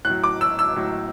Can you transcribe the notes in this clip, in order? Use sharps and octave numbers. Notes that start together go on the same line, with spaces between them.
A2 F#6
F#3
D6
E6
E6
A2 F#3